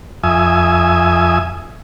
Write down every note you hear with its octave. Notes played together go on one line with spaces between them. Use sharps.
F2 E5 G#5 D#6